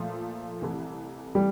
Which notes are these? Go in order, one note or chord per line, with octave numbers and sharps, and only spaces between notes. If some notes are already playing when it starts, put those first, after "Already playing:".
Already playing: A#2 F3 A3
C2 C3 E3 A3
C3 E3 G3 A3